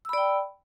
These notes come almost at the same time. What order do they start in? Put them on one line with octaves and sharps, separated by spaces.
E6 B5 D5 G5